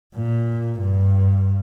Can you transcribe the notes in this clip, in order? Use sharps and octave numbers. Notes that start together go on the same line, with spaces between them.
A#2
G2